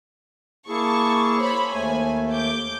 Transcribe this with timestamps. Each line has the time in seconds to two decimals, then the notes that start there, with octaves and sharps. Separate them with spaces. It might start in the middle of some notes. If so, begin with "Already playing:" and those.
0.69 A#3 E4 G#4 A5 C#6
1.39 C5 C#5 B5
1.73 D#2 A3 G#5
2.32 D6 G6